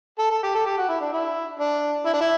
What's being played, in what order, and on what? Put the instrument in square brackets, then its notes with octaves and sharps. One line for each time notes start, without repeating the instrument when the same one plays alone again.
[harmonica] A4
A4
G4
A4
G4
F#4
E4
D4
E4
D4
E4
D4
E4